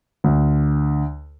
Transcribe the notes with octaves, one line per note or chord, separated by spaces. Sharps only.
D2